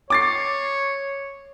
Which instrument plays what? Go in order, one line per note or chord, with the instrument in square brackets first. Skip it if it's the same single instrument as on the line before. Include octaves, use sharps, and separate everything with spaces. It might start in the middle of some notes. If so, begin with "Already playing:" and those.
[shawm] C#5 [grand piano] D6 A6 C7